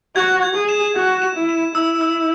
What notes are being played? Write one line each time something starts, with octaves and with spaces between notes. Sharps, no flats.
F#4 G#6
G#6
G#4
E7
F#4 G#6
E7
E4
E7
E4 E6
E6